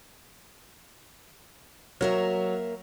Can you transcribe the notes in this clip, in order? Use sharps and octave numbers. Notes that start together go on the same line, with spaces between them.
F#3 A#3 A#4 E5